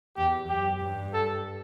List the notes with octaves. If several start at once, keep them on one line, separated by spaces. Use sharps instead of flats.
E2 G4
F#2 G4
G2
A4